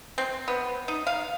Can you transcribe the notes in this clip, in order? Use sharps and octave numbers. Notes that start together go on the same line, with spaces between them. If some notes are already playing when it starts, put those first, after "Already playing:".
C4
B3
D#4
F5